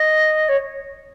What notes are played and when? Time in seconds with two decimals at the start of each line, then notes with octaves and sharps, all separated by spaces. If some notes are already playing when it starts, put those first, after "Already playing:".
Already playing: D#5
0.48 C#5